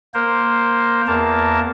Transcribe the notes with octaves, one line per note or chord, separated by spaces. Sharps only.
A#3 A#4 C5
E2 A#3 A#4 A5